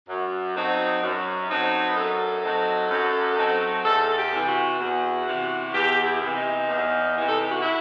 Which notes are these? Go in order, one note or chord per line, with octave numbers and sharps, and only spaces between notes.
F#2
F#3 A3 C4 D#4
F#2
F#3 A3 C4 D#4
B4
F#2 A4
F#3 A3 C4 D#4
F#2
F#3 A3 C4 D#4
E2 A4
G4
C3 E3
F#4
E2
C3 E3
E2 G4
E4
C3 E3
D#4
E2
C3 E3
A4
G4
F#4
E4